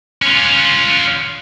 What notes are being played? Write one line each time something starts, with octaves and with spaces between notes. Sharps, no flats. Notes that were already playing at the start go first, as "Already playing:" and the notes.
C#4 F4